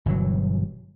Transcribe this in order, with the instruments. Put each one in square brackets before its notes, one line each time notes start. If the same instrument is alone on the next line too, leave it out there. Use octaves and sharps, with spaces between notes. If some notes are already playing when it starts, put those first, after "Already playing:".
[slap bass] G1 B2 E3 F#3